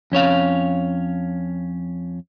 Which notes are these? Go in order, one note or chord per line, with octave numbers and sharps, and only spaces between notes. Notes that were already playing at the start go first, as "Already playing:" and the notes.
F2 C#4 C#5 F5